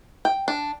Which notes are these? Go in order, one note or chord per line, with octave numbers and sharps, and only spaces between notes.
G5
D4